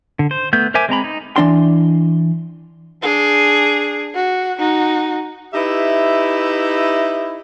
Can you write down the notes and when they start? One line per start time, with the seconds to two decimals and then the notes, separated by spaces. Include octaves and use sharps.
0.19 D3
0.31 C5
0.53 A3 B3 G6
0.74 A#4 C5 E5 G#5 D6
0.89 G#3 C4 A#5 B5
1.04 D#4
1.36 E3 D4 C6
3.02 D4 G#4
4.15 F#4
4.59 D#4 F#4
5.54 D#4 E4 G4 B4 E5